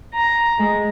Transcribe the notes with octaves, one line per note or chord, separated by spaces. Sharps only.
A#5
G#3